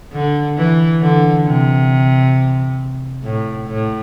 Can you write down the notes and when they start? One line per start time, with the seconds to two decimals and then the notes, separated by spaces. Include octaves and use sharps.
0.13 D3
0.57 E3
1.01 D3
1.46 C3
3.23 A2
3.68 A2